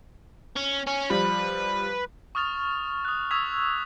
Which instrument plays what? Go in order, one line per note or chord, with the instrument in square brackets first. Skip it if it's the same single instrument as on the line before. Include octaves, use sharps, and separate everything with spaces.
[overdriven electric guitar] C#4
C#4
[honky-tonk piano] F3 G3 [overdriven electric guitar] B4
[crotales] C#6 D#6 F6 A6 F7
D#6 F#6
C#6 D#6 E6 G#6 B6 F7